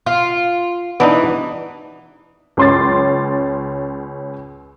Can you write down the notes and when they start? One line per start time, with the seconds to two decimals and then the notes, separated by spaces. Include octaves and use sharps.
0.06 F4
1.00 E3 B3 D4 D#4
2.57 C#2 C#4 C6 D6 A6